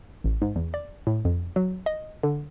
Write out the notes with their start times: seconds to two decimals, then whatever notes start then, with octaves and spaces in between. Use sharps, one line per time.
0.24 A1
0.42 G#2
0.56 E2
0.74 D5
1.07 A2
1.25 F2
1.56 F#3
1.86 D#5
2.23 D3